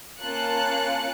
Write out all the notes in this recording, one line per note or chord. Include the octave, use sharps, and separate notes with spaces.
A#3 C#4 F4 A5 F#6 C#7